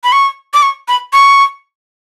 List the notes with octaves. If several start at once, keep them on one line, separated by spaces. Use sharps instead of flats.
B5
C#6
D6
C#6
B5
C#6